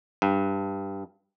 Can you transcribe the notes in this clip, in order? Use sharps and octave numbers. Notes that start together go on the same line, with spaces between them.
G2